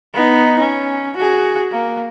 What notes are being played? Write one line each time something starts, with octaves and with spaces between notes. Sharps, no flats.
B3 D#4
C#4
F#4 G#4
A#3